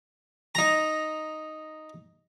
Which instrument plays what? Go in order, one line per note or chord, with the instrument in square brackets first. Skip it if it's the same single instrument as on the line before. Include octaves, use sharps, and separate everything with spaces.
[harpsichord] D#4 A#5